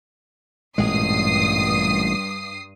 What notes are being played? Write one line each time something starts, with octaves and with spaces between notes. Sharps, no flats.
A1 G2 A#2 G#3 D#6 C7